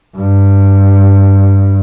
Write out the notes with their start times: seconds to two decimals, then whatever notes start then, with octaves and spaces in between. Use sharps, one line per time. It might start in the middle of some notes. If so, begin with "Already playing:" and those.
0.17 G2